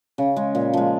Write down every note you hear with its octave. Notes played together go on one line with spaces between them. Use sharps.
C#3
G#3
A#2
F3 G#3